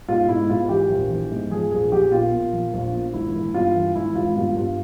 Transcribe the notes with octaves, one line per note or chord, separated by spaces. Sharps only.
G#2 F4
G#2 E4
G#2 F4
F4
E3 G4
A#1
E3
G#2
F3 G#4
A#1 G#4
A#1 G4
A#2 F4
A#2
F3
A#1
A#2
G#1 E4
E3
G2 F4
E3
G#1 E4
G#1 F4
G2 F4
G2 F4